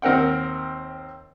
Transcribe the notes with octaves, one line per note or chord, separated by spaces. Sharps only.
D#2 C4 A#4 F#5 G5